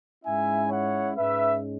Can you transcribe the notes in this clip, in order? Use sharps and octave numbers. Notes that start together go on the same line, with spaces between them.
G#2 G#3 C#4 E4 E5 G#5
C#5 F#5
G#2 G#3 C#4 B4 E5